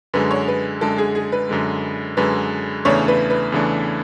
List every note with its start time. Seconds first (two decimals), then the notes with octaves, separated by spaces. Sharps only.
0.14 F#2 D3 G#3 B4
0.31 C#5
0.48 B4
0.81 F#2 D3 G#3 A4
0.98 G#4
1.15 G#4
1.32 B4
1.49 F#2 D3 G#3
2.17 F#2 D3 G#3 B4
2.85 E2 C#3 E3 A3 D4 C#5
3.08 B4
3.30 B4
3.52 E2 C#3 E3 A3 D4